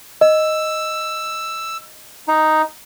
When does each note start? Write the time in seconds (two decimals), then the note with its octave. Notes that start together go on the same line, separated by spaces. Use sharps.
0.21 D#5 E6
2.28 D#4